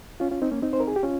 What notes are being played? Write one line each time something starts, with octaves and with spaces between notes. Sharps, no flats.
C#4 F4
C#4 F4
C4 D#4
A#3 C#4
C4 D#4
C5
A#4
G#4
G4
C#4 F4